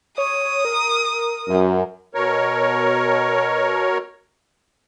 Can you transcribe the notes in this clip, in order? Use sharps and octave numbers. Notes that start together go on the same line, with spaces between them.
C#5 D#6
A#4
F#2
B2 A#4 C#5